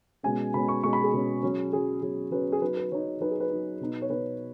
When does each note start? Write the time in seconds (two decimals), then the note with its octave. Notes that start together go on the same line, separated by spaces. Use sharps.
0.23 B2 G#3 C#4 G#5
0.54 B2 G#3 C#4 B5
0.68 C#6
0.83 B2 G#3 C#4 C#6
0.93 B5
1.04 G#4
1.13 B2 G#3 C#4
1.43 F#3 C#4
1.73 F#3 C#4 G#4
2.02 F#3 C#4 G#4
2.31 F#3 C#4 B4
2.52 G#4
2.61 F#3 D#4 B4
2.77 B4
2.92 F#3 D#4 C#5
3.20 F#3 D#4 B4
3.31 G#4
3.40 B4
3.50 F#3 D#4
3.80 B2 B3 D#4
4.02 C#5
4.10 B2 B3 D#4 B4